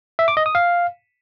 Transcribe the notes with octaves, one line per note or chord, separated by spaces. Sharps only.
E5
D6
D#5
D#6
F5